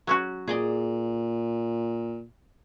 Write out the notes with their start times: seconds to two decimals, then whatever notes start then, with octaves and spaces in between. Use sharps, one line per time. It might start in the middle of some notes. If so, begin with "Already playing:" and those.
0.07 F#3 C#4 F#4
0.47 A#2 G#4 D5 D#5